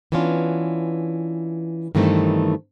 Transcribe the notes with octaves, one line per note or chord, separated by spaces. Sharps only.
E3 B3 C#4 D4 F4
G2 D#3 E3 A3 C4 D#4